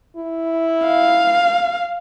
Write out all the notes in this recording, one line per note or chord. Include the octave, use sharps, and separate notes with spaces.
E4
F5